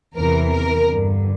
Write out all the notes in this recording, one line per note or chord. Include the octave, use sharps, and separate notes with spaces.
E2 C3 E3 A#4
A#4
G2 D3